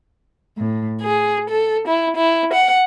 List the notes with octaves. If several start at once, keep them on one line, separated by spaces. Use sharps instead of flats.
A2
G#4
A4
E4
E4
F#5